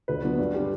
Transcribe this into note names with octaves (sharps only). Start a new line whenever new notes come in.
D2 B4
D3 F#3 B3
G2
D3 G3